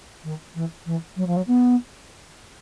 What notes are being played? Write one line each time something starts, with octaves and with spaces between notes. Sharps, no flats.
D#3
E3
E3
F#3
F3
F#3
B3